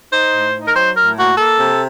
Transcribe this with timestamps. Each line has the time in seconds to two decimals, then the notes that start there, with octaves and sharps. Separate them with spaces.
0.13 D#4 C5
0.34 A2
0.55 D#4
0.67 A#4
0.76 F#3 C5
0.96 A2 A#4
1.18 A#3 F#4
1.37 A#3 A4
1.58 C3